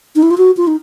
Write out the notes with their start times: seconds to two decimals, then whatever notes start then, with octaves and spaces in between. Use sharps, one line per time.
0.15 D#4
0.23 E4
0.31 F4
0.38 F#4
0.57 F4
0.67 D#4